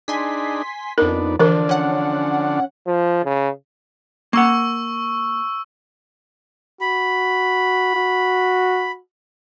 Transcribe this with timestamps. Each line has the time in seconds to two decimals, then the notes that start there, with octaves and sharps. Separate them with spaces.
0.08 D4 D#4 G#4 G#5 C6 B6
0.98 F2 B3 D4 D#4 A#4
1.39 D3 E3 F3 D4 A#4 D5
1.69 C#4 F#5
2.87 F3
3.25 C#3
4.33 A#3 F#5 C#6 E6
6.81 F#4 B5
7.95 F#4